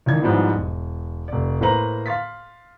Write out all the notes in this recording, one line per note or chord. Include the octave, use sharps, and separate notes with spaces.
C#2 D#3 E3 D4 G#6
G#2 F3 G3 G#3 B3 E4
E1
F1 D5
A2 A#3 B4 C5 A#5 F#7
F5 C6 A6 B6